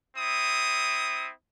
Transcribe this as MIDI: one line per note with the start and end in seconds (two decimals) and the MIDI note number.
0.17 1.32 60
0.17 1.32 64
0.17 1.32 87